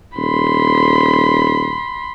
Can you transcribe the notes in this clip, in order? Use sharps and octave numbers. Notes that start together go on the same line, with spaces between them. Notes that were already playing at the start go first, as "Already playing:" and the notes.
D#1 B5 C6